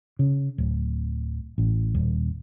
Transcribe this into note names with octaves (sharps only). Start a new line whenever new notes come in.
C#3
D1
A1
D#1